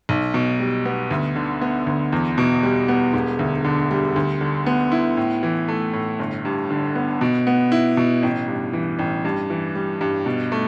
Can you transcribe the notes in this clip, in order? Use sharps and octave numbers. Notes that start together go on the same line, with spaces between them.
B1
B2
G3
B3
D2
D3
B3
D2
E2
B2
G3
B3
E1
D2
D3
G3
D2
D3
B3
E4
A2
E3
A3
A2
G1
G2
D3
B3
B2
B3
E4
B2
A1
G2
E3
A1
G2
E3
G3
G2
B2
A3